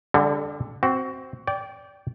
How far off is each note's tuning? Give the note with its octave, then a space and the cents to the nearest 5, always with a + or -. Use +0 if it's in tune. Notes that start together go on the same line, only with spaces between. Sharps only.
D3 -10 G3 +40 A4 +20
C4 +0 F#4 +20
D5 -25 G5 +0